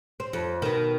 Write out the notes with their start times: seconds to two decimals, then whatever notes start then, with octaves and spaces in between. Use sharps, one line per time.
0.20 C4
0.33 F2
0.62 B2 D#3